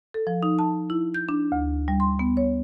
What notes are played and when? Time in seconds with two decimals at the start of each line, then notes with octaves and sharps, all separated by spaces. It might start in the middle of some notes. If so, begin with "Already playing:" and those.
0.14 A4
0.27 F3
0.43 D#4
0.59 A5
0.90 E4
1.14 G6
1.29 D4
1.52 D2
1.88 G3
2.00 C6
2.19 B3
2.37 C#5